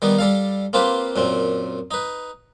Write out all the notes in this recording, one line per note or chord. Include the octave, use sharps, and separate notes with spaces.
D#3 G3 B3
G3 A4 F5
A#3 C4 F4 G4 B4
F#2 A#2 C4
D#4 B4